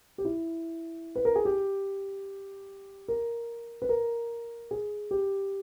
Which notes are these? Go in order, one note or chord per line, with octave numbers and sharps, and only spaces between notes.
G4
E4
B4
A#4
G#4
G4
A#4
B4
A#4
G#4
G4